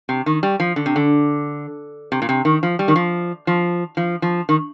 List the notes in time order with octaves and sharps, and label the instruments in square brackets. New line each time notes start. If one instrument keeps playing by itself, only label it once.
[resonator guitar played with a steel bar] C3
D#3
G3
F3
D3
C3
D3
C3
A#2
C3
D#3
F3
G3
D#3
F3
F3
F3
F3
D#3